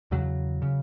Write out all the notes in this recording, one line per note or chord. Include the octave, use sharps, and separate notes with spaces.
E2 C#3 F#3
C#3